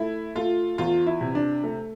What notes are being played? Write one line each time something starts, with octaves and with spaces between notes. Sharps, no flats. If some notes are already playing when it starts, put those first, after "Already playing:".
Already playing: A3 E4
A3 F4
E2 F4
E4
C3
D4
A3